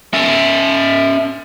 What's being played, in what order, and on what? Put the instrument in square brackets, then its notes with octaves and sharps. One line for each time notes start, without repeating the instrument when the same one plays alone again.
[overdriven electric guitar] C#4 E5